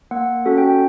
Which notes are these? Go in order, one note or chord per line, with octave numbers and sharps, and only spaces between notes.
A#3 F#5
C#4 F#4 A4
G5